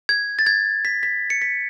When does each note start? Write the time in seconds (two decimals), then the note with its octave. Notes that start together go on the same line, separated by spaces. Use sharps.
0.09 G#6
0.39 A6
0.46 G#6
0.85 B6
1.03 B6
1.30 C#7
1.42 B6